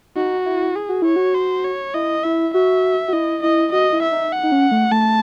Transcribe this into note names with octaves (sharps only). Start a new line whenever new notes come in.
D#4 F#4
E4
G#4
F#4
E4 C#5
F#4
C5
C#5
E4 D#5
E4 E5
F#4 E5
F#4
E4 D#5
E4 D#5
F#4 D#5
E4
E5
D#4
F#5
D#4
C#4
A3
A3 A5